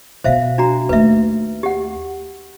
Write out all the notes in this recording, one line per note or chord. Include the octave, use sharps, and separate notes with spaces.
B2 B3 C5 E5 F5
D4 F#4 A#5
D#2 A3 B4 E5
G4 F#5